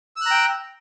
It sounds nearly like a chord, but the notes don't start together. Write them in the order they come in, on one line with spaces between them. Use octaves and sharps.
E6 F#6 A#5 G5